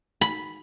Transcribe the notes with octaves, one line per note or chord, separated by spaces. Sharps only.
B5